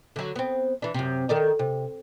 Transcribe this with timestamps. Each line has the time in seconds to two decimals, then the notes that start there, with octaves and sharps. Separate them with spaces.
0.16 D3 F#3
0.36 B3 C4
0.82 E3 D4
0.94 F#2 C3
1.29 D#3 A4 D5
1.59 C3